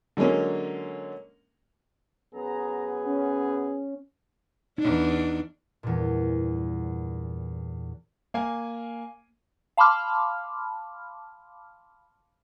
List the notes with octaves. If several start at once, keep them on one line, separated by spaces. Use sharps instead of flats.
D3 F#3 G#3 A#3 C#4
F#2 B3 G#4 A#5
C#4
E2 D4 D#4
E2 G2 A#2
A#3 G#5
F5 A5 B5 C6 D6 F6